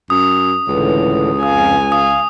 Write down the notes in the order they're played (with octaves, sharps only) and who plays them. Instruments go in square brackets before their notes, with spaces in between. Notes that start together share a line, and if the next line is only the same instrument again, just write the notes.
[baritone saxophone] F#2 [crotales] D#6
[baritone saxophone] C#2 [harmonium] A2 D3 E3
[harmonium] F2 F5 [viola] G#5 [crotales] D#6
[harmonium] F5 [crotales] D#6